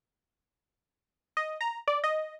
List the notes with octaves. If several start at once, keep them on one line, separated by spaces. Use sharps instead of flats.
D#5
A#5
D5
D#5